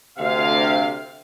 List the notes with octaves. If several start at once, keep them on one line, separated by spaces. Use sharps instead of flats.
D2 C3 F5